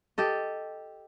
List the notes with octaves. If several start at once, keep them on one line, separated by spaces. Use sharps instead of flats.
G4 A4 D#5